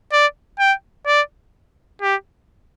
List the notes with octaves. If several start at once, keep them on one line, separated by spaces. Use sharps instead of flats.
D5
G5
D5
G4